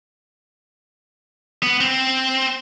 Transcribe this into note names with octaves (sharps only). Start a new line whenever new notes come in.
B3
C4